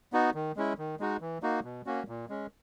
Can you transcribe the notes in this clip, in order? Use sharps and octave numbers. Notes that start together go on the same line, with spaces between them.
B3 D#4 F#4
D#3
G#3 C#4 E4
D#3
G#3 D#4 F#4
E3
A#3 D#4 F#4
B2
A#3 C#4 F#4
A#2
G#3 C#4